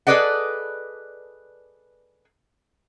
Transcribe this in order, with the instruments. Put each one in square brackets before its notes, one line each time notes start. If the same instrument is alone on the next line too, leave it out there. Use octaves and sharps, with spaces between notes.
[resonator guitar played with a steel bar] G#4 A4 B4 D5 D#5 F#5